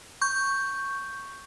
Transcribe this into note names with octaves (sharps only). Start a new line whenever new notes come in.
C#6 G6